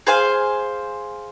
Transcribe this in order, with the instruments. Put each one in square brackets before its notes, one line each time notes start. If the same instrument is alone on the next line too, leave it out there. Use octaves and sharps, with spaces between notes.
[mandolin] G#4 C5 F5 G#5